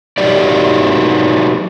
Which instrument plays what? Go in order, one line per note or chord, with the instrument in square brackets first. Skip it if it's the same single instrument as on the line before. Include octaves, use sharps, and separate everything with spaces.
[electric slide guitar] F#3 D#4 G4 D5